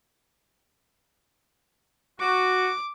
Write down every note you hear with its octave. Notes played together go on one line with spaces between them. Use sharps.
F#4 D6